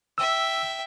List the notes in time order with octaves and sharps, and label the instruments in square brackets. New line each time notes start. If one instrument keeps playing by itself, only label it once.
[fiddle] E5 G5 [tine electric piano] E6